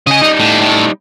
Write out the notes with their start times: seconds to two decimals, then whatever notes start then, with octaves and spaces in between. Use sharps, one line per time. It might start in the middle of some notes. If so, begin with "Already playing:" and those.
0.07 C#3 G#4 D#5
0.21 G3 D#4
0.40 A2
0.61 A2